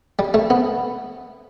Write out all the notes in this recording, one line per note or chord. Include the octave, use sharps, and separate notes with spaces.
G3
A3
B3